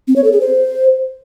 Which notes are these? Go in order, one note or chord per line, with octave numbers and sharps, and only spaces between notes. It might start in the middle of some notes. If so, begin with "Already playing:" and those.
C4
C#5
A4
G#4
C5